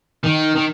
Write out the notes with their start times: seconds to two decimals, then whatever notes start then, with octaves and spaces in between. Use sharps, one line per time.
0.24 D#3
0.56 D#3